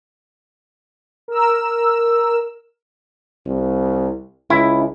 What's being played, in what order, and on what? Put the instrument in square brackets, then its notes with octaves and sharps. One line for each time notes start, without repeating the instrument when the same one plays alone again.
[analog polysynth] A#4 E6
[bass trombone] C2
[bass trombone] C#2 [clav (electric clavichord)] E4